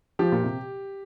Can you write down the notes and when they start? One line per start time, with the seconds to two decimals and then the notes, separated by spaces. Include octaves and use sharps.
0.19 F3 G4
0.32 A#2
0.43 C3